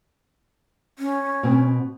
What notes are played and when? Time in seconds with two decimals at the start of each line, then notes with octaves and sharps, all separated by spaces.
0.99 C#4
1.43 B2 C4